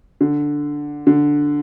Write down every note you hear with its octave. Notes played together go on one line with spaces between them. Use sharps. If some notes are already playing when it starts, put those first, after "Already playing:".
D3
D3